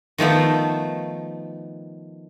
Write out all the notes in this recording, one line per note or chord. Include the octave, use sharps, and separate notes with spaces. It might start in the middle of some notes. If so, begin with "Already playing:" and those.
D#3 F3 A3 B3